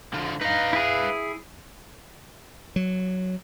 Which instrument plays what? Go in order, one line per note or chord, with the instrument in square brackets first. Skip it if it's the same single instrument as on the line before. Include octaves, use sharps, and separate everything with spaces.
[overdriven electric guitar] D3 F3
[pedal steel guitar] D#4 [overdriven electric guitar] B4 F5
[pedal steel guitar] E4 G#4
[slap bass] F#3